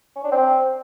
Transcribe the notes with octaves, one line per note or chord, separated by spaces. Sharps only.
C#4
D4
C4